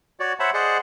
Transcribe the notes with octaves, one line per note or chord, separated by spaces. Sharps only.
F#4 C#5 D5
C5 C#5 E5 F#5 A5 B5
G#4 C5 D5 D#5 F#5